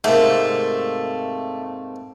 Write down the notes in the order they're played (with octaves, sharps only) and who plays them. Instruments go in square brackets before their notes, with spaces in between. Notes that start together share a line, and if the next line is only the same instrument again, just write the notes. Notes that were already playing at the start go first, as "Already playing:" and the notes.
[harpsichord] G#2 C3 A#3 [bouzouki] A3